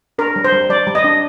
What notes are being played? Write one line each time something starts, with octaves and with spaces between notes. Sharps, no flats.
D4 A#4
G3
C5
G3
G3 D5
G3
D#5
D4